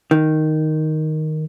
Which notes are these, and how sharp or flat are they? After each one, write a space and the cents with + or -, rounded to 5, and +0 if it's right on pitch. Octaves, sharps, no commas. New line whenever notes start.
D#3 +0